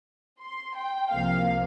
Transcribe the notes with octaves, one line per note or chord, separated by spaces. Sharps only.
C6
G5
C2 C3 F3 A#3 F5